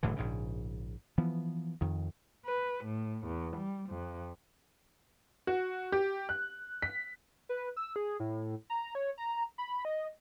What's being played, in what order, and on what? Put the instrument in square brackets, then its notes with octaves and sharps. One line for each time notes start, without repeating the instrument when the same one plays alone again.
[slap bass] F#1 A2 D3 E3
A#1 G#2 C#3
E3 F3 B3
F2 D#3
[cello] B4
A2
E2
G3
F2
[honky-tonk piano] F#4
G4
F#6
B6
[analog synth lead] B4
E6
G#4
A2
A#5
C#5
A#5
B5
D#5